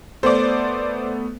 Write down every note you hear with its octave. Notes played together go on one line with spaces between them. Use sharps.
A3 B3 A4 C5 D5